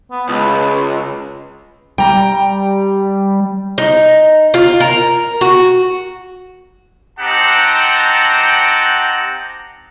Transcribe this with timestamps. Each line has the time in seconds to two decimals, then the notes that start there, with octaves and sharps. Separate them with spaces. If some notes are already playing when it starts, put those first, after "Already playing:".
0.11 B3
0.29 C#2 B4
1.98 G3 G5 A#5
3.78 D#4
4.54 F4
4.80 A#4
5.41 F#4
7.19 C4 D#4 G4 F#5 A5 A#5